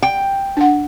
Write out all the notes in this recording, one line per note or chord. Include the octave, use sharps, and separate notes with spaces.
G5
D4 F#5